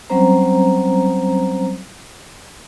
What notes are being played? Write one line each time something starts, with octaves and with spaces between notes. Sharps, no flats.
F#3 G3 C4 C#4 C5 A#5